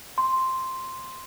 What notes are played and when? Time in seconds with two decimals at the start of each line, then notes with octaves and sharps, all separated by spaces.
0.18 C6